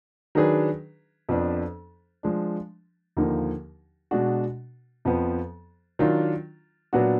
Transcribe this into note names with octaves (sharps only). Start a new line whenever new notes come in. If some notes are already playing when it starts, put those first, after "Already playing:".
D#3 F#3 D4 G#4 B4
F2 F3 B3 D4
F3 G#3 D4
D#2 D3 F3 A#3 D#4
B2 G#3 D4 F#4
F2 F3 B3
D#3 F#3 D4 F4
A#2 F#3 B3 D4 F#4